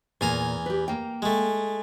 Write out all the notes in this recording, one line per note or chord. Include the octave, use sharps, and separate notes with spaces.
E2 A#2 G#5 A#5
G4 B4
A#3 G5
G#3 A3